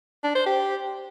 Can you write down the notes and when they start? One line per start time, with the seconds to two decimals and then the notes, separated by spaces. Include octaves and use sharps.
0.24 D4
0.35 C5
0.46 G4